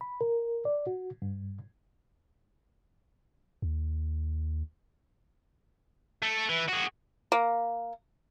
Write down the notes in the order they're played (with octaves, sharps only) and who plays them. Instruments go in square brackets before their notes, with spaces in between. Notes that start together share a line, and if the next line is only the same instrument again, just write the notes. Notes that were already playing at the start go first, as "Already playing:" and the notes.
[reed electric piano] B5
A#4
D5
F#4
G2
[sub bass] D#2
[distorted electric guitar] A3
E3
F#4 G#4
[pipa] A#3